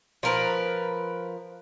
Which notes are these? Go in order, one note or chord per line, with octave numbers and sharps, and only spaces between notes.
F3 A#4 B4